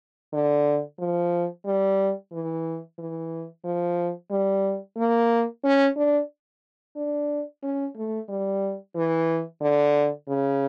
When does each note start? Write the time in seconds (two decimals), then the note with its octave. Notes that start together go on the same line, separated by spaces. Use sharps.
0.33 D3
0.99 F3
1.65 G3
2.32 E3
2.98 E3
3.64 F3
4.31 G3
4.97 A#3
5.64 C#4
5.97 D4
6.96 D4
7.63 C#4
7.96 A3
8.29 G3
8.95 E3
9.62 D3
10.28 C#3